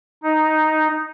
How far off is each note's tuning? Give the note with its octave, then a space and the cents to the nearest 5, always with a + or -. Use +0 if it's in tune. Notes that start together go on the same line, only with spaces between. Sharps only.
D#4 +0